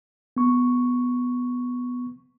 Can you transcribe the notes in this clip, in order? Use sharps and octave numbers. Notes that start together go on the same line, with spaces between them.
B3 C#6